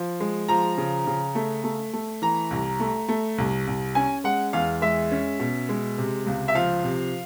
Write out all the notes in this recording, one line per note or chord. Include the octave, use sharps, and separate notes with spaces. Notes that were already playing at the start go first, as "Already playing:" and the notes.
Already playing: F3
G#3
F3 A#5
C#3
C#3
A3
A3
A3
E3 A#5
C2
A3
A3
C2
C2
C#4 G#5
G#3 F#5
E2 F5
G#3 E5
C#4
B2
G#3
C3
C#2
E5
F3 F5
C3